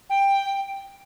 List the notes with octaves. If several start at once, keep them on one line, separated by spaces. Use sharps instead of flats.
G5